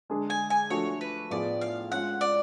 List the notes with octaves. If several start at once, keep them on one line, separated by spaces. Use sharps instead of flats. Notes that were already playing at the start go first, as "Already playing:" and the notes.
D3 G#3 D4 G#4
G#5
G#5
F3 A3 D4 F#4 A4 C#5
B4
A2 F3 B3 F4 G#4 D5
F5
G#3 C#4 F4 F#5
D5